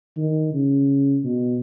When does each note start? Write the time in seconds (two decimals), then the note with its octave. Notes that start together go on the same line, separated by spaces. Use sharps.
0.17 D#3
0.53 C#3
1.24 B2